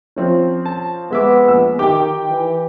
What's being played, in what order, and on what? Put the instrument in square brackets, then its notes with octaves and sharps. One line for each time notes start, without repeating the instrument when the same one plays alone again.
[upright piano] F3 C4 C#4
[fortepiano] A5
[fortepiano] G#3 E5 D6 [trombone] B3
[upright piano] A#1 E6
[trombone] D#3 [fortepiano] G4 [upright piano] G5 D6
[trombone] E3